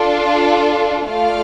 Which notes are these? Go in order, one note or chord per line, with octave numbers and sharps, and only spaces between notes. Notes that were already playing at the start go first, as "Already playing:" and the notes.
Already playing: D4 F4 A4
A3 F4 A4 D5 F5